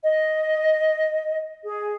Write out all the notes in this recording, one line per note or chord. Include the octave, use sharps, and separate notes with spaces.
D#5
G#4